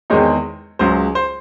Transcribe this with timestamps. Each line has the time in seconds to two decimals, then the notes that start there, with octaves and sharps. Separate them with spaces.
0.10 E2 D#3 G#3 C4 D#4 C#5
0.79 C#2 C#3 F#3 C5
1.15 C5